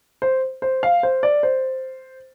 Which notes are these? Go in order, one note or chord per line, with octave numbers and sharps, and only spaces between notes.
C5
C5
F5
C5
D5
C5